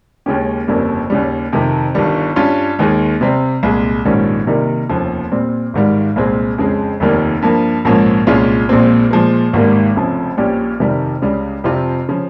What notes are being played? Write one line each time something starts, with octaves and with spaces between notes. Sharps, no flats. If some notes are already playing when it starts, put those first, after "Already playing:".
D#2 C#3 G#3 C#4 G4
G1 F2 C#3 G3 A#3
D#2 C#3 G3
F2 C3 D#3
G1 G2 D#3 G3
G2 G3 C#4 F4
D#2 D#3 G#3
C3 G3 C4
C2 A#2 G#3
A#1 G#2 D#3 G3 C#4
C3 D#3 G3 A#3 D#4
F1 D#2 C#3 F3
A#2 G3 C4
G#1 G#2 D#3 G3
C2 A#2 G#3 C4
F2 C#3 G#3
F1 D#2 D#3 G3 A#3
G2 F3 A#3
A#1 G#2 F3 A#3 C#4
C2 A#2 G#3 C#4 F4
A#1 A#2 G#3 C4
A#2 F3 G#3
G#1 G#2 D#3 G3 A#3
F1 F2 C#3 F3
A#1 A#2 G3 C#4 G4
F2 C3 D#3 G3
C#2 C#3 G3
F2 C3 G3 C4 F4
C#3 F3